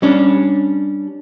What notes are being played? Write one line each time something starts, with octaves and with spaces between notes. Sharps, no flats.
G3 C#4 D4